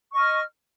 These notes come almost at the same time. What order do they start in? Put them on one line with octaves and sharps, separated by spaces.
C#6 D#5 F6